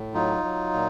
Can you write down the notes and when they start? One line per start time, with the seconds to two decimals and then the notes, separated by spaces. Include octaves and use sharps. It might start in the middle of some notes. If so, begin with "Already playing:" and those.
Already playing: A2
0.14 F#3 D#4 F4
0.44 F#3
0.74 A#2